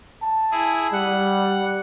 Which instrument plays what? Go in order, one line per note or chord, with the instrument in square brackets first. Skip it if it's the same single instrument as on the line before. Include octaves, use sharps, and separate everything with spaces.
[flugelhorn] A5
[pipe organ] E4 G#4
[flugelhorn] G3 [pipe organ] F#5